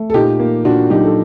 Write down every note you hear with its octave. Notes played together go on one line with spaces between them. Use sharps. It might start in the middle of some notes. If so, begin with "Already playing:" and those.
Already playing: A3
A4
A#2 D#4 G4
A#3
A#2 D4 F#4
F#3 D#4 G4
A4